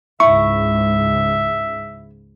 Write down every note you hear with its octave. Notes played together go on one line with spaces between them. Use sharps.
C#2 G#2 E4 E5 C#6